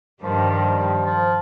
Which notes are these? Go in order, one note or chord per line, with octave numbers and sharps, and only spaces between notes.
G2 D#3 F3 G3
F3
F3
F3